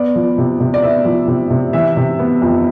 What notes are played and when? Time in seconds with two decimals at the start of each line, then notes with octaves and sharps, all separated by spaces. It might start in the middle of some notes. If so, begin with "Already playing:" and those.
Already playing: B3 D5
0.15 F3
0.38 C3
0.60 C3
0.74 D5
0.82 B3 E5
1.05 F3
1.28 C3
1.50 C3
1.73 E3 E5
1.97 C3
2.19 B3
2.42 F2